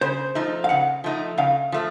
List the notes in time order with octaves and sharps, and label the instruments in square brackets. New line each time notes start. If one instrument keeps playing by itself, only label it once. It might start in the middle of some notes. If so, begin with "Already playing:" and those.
[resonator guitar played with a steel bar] C#3 [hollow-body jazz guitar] C5
[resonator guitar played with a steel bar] F3 A3 D#4
[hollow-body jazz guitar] F5
[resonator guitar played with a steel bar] C#3 [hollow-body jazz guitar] F#5
[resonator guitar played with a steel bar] F3 A3 D#4
[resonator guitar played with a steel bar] C#3 [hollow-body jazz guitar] F5
[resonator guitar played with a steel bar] F3 A3